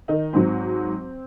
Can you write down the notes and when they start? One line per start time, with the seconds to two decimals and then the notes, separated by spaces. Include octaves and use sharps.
0.08 D#3 D#4
0.33 G#2 F#3 C4